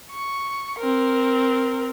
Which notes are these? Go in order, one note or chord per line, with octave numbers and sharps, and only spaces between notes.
C#6
C4 A#4